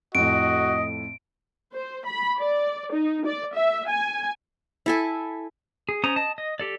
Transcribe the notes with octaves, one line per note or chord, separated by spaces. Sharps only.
F2 A2 F#4 D#5 D7
C5
B5
D5
D#4
D5
E5
G#5
E4 A4 G#5
G#4
C#4 C5 A#5 D#6
D#5 A5
D#5
G4 A4 D5